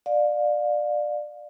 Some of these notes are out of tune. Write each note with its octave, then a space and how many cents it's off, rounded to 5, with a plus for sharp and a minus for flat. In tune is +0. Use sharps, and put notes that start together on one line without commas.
D5 +20 F5 +25